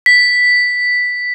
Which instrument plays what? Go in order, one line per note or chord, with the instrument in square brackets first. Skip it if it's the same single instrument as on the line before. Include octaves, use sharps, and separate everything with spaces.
[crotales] B6